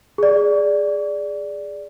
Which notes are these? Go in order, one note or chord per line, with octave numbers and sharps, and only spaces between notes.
G#4 D5